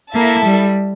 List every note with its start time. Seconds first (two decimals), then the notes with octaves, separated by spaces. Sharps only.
0.14 A#3 E4 A4 E5 A5
0.44 G3